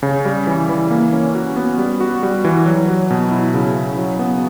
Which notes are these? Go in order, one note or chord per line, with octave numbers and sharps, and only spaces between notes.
C#3
G3
E3
E3
A#3
C#4
F#4
B3
G3
F#4
G3
E3
F#3
F#3
B2
E4
C#3
C#3
F#3
B3